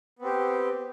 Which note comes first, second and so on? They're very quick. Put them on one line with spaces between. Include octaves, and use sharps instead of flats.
B3 C4 G4